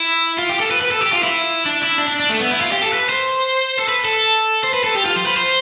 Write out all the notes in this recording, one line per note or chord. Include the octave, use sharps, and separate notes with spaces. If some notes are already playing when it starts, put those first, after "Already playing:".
Already playing: E4
F4
G4
A4
B4
B4
A4
G4
F4
E4
D4
E4
D4
D4
D4
A3
B3
E4
F4
G4
A4
B4
C5
A4
B4
A4
C5
B4
A4
G4
F4
C5
B4
C5